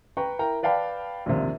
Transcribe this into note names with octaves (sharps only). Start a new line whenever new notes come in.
B4 G5 A#5 C#6
E4 A#4 G5 A#5
B4 D5 F5 G5 A5 B5
A#1 D#2 C3